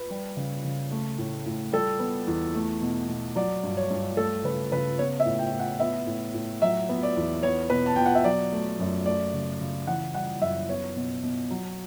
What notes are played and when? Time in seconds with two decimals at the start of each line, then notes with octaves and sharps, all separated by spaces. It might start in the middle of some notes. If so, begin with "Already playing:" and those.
Already playing: B4
0.10 G3
0.37 C#3
0.64 C#3
0.91 A3
1.18 A2
1.46 A2
1.72 G3 A4
1.99 B3
2.27 E2
2.54 A3
2.82 B2
3.09 B2
3.36 F#3 D5
3.63 G2
3.77 C#5
3.91 G2
4.17 A3 A4
4.44 C#3 B4
4.72 C#3 B4
4.99 B3 C#5
5.20 E5
5.25 A2
5.39 G5
5.54 A2
5.59 F#5
5.80 B3 E5
6.07 A2
6.34 A2
6.62 F#3 E5
6.89 B3
7.03 D5
7.17 E2
7.43 B3 C#5
7.70 B2 B4
7.86 A5
7.96 B2 G5
8.06 F#5
8.15 E5
8.24 F#3 D5
8.52 A3
8.79 F#2
9.06 A3 D5
9.33 C#3
9.60 C#3
9.87 E3 F#5
10.14 G3 F#5
10.41 F#2 E5
10.69 B3 C#5
10.96 B2
11.23 B2
11.51 F#3